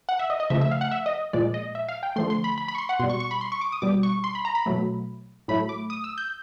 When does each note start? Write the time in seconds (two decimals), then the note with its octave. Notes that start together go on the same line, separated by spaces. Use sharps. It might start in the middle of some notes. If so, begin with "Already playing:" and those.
0.09 F#5
0.19 E5
0.30 D#5
0.40 D#5
0.50 C#3 F3 A3 E5
0.61 E5
0.71 F5
0.81 F#5
0.91 E5
1.06 D#5
1.33 A#2 F3 G#3 D5
1.54 D#5
1.75 E5
1.88 F5
2.03 G5
2.16 D3 F3 A3 C6
2.30 C6
2.44 B5
2.58 B5
2.68 B5
2.75 C#6
2.78 C6
2.89 F#5
3.00 B2 C6
3.03 G3
3.10 C#6
3.20 C#6
3.31 B5
3.41 C6
3.52 C#6
3.61 D6
3.72 D#6
3.82 B2 G3 D6
4.03 C#6
4.24 C6
4.35 B5
4.45 A#5
4.55 B5
4.66 B2 F#3 A3
5.48 A2 F#3 A3 B5
5.69 D6
5.90 D#6
6.04 E6
6.18 G6